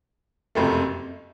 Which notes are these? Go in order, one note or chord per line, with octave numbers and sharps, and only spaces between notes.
F#1 F2 C3 A3